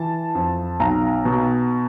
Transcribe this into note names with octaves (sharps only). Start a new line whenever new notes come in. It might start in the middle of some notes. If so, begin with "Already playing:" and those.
Already playing: E3 A5
F2
B1 A#5
B2